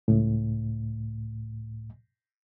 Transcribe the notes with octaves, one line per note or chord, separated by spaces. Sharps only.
C#2 A2